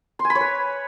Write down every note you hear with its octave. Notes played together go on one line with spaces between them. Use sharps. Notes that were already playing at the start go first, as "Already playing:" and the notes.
C6
G#5
B5
C#5
B4